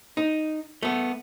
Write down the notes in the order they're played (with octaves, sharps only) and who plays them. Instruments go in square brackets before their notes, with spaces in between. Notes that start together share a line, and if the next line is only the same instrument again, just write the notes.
[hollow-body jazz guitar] D#4
A3 B3